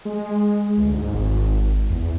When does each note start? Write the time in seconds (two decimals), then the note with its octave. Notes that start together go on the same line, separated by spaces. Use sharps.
0.05 G#3
0.78 D2
0.94 G#2
1.14 G#1
1.90 E2